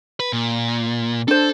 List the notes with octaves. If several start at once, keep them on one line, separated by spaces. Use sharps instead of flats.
B4
A#2
D4 A4 C5